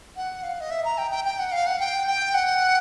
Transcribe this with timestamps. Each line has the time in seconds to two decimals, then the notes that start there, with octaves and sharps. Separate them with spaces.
0.16 F#5
0.43 F5
0.61 D#5
0.71 E5
0.85 A#5
0.98 G5
1.11 G5
1.25 G5
1.39 F#5
1.52 F5
1.67 F#5
1.80 G5
2.07 G5
2.34 F#5